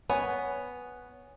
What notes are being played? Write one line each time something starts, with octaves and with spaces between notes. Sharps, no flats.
B3 C#5 G#5